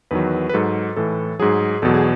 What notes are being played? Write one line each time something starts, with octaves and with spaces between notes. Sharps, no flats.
E2 D#3 F#3 B4
B4
G#2 F#3 A4
A2 E3 A4
G#2 F#3 G#4
E2 B2 F#3 A4
G#4